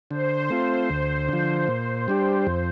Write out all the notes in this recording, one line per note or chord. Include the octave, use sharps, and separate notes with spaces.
D3 C5
A3 C4 F4 C5
D2 C5
D3 F3
A#2
G3 D4 G4
F2